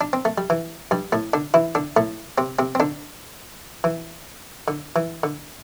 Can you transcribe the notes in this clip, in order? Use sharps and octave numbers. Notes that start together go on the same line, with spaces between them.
D4
C4
A3
G3
E3
G2 G3
A2 A3
D3 D4
E3 E4
D3 D4
A2 A3
C3 C4
C3 C4
C4
D3 D4
E3
D3
E3
D3